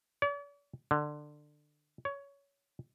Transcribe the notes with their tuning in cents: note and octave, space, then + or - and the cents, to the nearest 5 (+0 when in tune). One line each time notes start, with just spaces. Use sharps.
D5 -45
D3 +20
C#5 +15